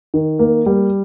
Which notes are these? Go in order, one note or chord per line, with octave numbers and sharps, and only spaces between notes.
D#3
A#3
G3